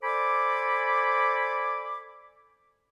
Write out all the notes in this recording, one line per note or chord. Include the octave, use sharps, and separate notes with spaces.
A4 C5 D5 G#5 B5 D6